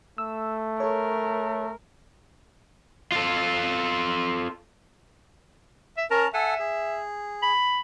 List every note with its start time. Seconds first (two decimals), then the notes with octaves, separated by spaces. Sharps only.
0.18 A3 E6
0.80 A4 A#4 C#5
3.12 F4 A4
5.97 E5
6.11 C#4 A#4 A5 A#5
6.34 A4 E5 F#5 G#5
6.60 G#4
7.43 B5